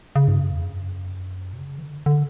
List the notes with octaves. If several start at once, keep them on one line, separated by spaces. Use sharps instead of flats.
C#3
G2
F#2
E2
F#2
B2
C#3
E3
D3
D3